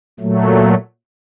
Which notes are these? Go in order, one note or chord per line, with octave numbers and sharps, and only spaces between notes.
A#2 F#3 A3